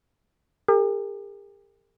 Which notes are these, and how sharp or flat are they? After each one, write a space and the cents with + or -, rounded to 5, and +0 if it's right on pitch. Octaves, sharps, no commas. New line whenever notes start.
G4 +40 A#4 -40